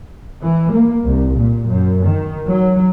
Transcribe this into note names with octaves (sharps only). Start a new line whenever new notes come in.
E3
A#3
C2
A#2
F#2
D#3
F#3